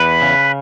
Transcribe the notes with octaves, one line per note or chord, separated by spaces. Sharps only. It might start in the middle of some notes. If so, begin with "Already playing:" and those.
Already playing: E2 B4
C#3